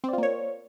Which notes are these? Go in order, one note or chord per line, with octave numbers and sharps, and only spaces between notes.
A#3 C4 F4 C#5 D5